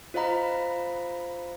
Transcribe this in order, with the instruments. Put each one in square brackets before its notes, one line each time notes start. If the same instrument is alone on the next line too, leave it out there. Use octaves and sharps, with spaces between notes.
[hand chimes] F4 C5 D#5 F5 A#5 B5